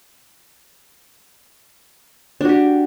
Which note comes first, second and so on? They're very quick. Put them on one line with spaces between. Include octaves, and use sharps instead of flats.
D4 F#4 G4